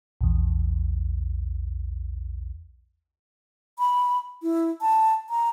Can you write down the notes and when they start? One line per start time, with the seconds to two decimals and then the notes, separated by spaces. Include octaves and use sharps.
0.21 A#1 E2
3.79 B5
4.43 E4
4.81 A5
5.30 A#5